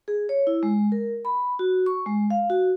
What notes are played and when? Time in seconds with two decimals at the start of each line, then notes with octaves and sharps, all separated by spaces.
0.08 G#4
0.29 C#5
0.47 E4
0.63 G#3
0.92 A#4
1.25 B5
1.59 F#4
1.86 C#6
2.06 G#3
2.30 F5
2.50 F#4